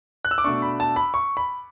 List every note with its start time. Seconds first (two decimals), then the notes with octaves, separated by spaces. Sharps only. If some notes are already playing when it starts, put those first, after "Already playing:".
0.25 F#6
0.31 E6
0.38 D6
0.44 B2 A3 D4 C#6
0.62 B5
0.80 A5
0.96 B5
1.14 C#6
1.37 B5